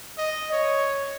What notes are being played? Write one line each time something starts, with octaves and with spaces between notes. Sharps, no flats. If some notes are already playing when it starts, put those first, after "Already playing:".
D#5
C#5